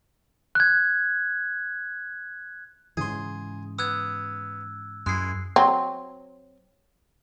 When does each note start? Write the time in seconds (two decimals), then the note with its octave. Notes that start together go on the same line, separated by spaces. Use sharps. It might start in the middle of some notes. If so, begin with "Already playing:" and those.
0.55 F#6 G#6
2.97 G#2 C#3 E3 G#4 C6
3.79 B3 E6 F#6 G#6
5.06 F#2 G#3 E4 F#6 C7
5.56 F#3 C4